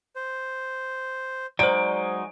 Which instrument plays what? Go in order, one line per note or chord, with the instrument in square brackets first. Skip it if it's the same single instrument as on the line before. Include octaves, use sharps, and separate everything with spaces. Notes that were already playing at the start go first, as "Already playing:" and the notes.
[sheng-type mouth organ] C5
[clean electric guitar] F#3 G#3 D#4 [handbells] C5 D5 [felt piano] D7